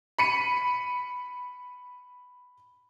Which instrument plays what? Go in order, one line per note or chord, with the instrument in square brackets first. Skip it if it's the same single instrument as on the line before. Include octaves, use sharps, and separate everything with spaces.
[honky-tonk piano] B5 C#7 D#7